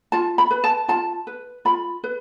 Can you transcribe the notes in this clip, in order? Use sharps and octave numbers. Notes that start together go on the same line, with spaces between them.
F4 A5
B5
B4
A5
F4 A5
B4
F4 B5
B4